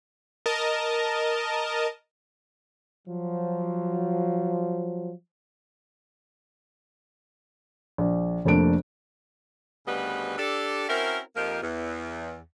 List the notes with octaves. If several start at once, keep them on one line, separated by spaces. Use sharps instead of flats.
A#4 D#5 A5
F3 F#3
A#1
F1 F2 A3 A#3 D4 D7
D2 C#3 G3 B3 B4 D#5
D4 G4 A4
C4 C#4 E4 F#4 A#4
F2 F3 A#3 D#4 G4 A#4
E2